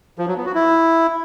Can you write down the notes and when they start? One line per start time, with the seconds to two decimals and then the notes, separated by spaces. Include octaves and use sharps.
0.18 F3
0.28 F#3
0.37 B3
0.46 F#4
0.55 E4